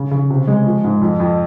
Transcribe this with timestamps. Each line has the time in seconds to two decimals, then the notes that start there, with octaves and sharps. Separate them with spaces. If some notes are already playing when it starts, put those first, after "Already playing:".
Already playing: C#3
0.11 C#3
0.30 C3
0.47 G#3
0.66 F3
0.84 G#2
1.01 F2
1.20 F2